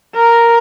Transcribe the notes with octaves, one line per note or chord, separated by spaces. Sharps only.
A#4